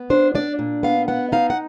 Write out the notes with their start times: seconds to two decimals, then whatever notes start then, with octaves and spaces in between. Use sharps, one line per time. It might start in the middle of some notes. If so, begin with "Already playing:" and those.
Already playing: B3
0.10 D4 C5
0.35 D4 D5
0.59 A#2
0.83 B3 F5
1.08 B3 F#5
1.32 D#4 F5
1.50 F#5